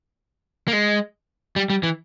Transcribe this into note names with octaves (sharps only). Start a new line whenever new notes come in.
A#3
G#3
G3
G3
E3